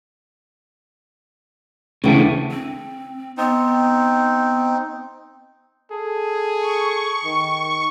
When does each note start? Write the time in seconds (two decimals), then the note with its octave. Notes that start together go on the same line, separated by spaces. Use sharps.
2.04 D2 C#3 E3 A3 G5
2.51 C4
3.38 B3 C4 D#4
5.92 G#4 A4
6.59 C#6
7.25 D#3